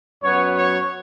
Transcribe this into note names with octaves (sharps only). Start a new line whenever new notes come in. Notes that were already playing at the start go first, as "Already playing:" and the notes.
F#2 F#3 B3 C#5
C#5